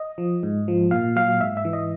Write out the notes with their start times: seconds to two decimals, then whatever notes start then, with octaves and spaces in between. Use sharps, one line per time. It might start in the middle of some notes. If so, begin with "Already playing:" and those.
Already playing: D#5
0.18 F3
0.43 G#2
0.68 F3
0.91 A#2 F5
1.16 F#3 F5
1.40 G#2 E5
1.57 E5
1.65 E3
1.73 D#5